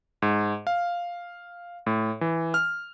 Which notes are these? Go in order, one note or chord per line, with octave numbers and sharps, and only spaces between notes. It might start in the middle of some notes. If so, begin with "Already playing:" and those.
G#2
F5
A2
E3
F6